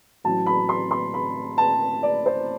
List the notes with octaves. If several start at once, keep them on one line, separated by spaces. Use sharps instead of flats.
A1 A2 F#3 A5
B5
C6
C6
B5
A5
D5
C5